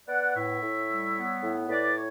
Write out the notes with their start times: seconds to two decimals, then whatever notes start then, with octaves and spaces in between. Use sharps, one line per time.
0.08 B3 D5 F#5
0.35 A2 C#5 E5
0.62 A2
0.88 G3
1.16 B3
1.42 A2
1.69 A2 B4 D5
1.95 C#5